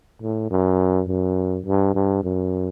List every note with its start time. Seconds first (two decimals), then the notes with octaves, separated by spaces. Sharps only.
0.22 A2
0.51 F#2
1.07 F#2
1.66 G2
1.94 G2
2.23 F#2